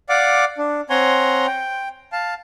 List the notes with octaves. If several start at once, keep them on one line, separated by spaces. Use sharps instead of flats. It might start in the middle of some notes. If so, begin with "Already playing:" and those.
D5 F5 F#5 D6
D4
C4 C#5 F#5 G#5 A#5 C6
G5
F5 A5